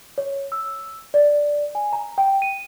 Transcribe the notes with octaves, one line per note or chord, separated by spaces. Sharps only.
C#5
E6
D5
G#5
A#5
G5
D#7